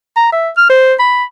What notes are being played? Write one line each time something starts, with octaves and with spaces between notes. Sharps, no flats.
A#5
E5
F6
C5
B5